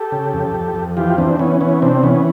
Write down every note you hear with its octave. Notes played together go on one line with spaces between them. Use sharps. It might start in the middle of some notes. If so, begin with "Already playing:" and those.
Already playing: G4 A4
C#3
F2
F2
F2
E3 F4 G4
E3 C4 D4
E3 B3 C#4
E3 B3 C#4
C3 C4 D4
E3 B3 C#4